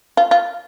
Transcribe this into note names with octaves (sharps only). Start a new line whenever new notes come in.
F4
F4